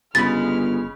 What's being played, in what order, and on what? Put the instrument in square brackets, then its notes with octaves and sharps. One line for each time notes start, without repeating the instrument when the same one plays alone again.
[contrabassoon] G1 [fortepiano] C#3 B5 [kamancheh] G#3 F6 [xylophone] A6